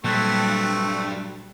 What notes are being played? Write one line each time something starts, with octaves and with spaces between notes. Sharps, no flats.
G2 A#2 F#3 G3 A3 C4 C#6